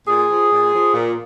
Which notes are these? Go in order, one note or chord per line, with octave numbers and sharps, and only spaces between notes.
A#2 G#4
F3
A#2
F3
A#2